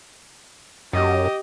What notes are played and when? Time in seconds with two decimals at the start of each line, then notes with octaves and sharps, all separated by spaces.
0.93 F#2 G4 D#5